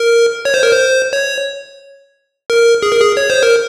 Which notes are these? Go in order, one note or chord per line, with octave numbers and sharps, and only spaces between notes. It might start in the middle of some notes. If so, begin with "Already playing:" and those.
Already playing: A#4
C#5
C5
A#4
C5
C#5
A#4
G#4
A#4
G#4
C#5
C5
A#4